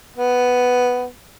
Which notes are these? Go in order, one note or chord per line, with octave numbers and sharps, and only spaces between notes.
B3